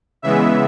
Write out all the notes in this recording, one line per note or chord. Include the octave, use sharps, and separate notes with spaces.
C#3 E3 G#3 B3 E5